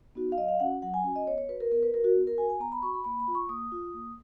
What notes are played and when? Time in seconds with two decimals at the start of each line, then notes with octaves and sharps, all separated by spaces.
0.15 B3 D#4 F#4
0.32 F5
0.37 F#3 D#5
0.48 F5
0.60 C#4 F#4 F#5
0.82 F#3 F#5
0.94 G#5
1.04 C#4 F#4 G#5
1.16 D#5
1.27 B3 C#5
1.38 C#5
1.49 F#4 B4
1.60 A#4
1.72 B3 A#4
1.83 B4
1.94 F#4 A#4
2.04 F#4
2.16 B3
2.27 A#4
2.38 F#4 G#5
2.50 G#5
2.60 B3 A#5
2.72 B5
2.82 F#4 C#6
2.94 B5
3.04 A#3 B5
3.20 B5
3.28 F4
3.35 C#6
3.49 A#3 D#6
3.72 F4
3.94 A#3